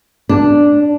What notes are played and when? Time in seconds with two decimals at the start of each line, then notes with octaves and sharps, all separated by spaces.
0.29 D4